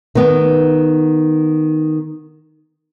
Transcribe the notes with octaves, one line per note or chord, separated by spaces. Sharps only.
D#3 B3